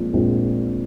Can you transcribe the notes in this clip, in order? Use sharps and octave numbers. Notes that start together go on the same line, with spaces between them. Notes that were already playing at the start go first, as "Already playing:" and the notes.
Already playing: A#1 A#2 F3 G#3 C4
A#1 A#2 F3 G#3 C4